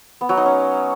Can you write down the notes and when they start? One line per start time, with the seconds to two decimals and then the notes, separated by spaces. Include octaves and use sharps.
0.21 B3
0.29 F#3
0.37 D#4
0.46 C#4